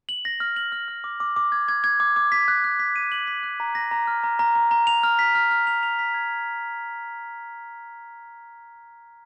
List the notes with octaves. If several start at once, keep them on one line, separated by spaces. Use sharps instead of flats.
F#7
A#6
F6
F#7
F6
F6
D6
D6
D6
G#6
G#6
G#6
D6
D6
B6
F#6
F#6
B6
D#7
F#7
B6
F#6
A#5
A#6
A#5
F6
A#5
A#5
A#5
A#5
F7
F6
B6
F6
F6
F7
F7
B6
G#6